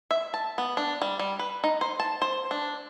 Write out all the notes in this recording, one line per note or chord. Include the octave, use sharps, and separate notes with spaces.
E5
A5
B3
D4
G3
G3
B4
D#4
C5
A5
C5
D4